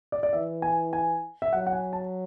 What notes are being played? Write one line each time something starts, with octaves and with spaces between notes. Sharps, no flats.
D5
D5
E3 E5
G#5
G#5
E5
F#3 F#5
F#5
G#5
A5